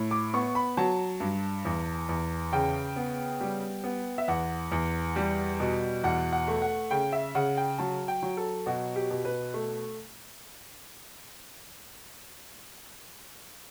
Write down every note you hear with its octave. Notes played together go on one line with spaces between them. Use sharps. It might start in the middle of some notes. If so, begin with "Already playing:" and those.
Already playing: A2
D6
B3 C#6
B5
F#3 A5
G2
E2
E2
C#3 G5
B3
G3
B3
E5
E2 F#5
E2
G3
B2
E2 F#5
F#5
A3
F#5
C#3 G5
E5
C#3 F#5
G5
F#3 A5
G5
F#3
A4
B2 F#4
G4
B2
B4
A3